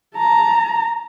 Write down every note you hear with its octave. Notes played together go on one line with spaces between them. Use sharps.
A5 A#5